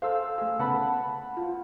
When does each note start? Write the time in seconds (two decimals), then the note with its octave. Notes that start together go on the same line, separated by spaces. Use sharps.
0.02 G#4 A4 C5 F5 E6
0.38 A3 G#4
0.59 C#3 B3 B4 F#5 A5 B5
1.37 F4